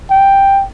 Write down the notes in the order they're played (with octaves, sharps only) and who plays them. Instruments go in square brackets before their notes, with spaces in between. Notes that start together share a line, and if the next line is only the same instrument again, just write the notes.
[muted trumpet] G5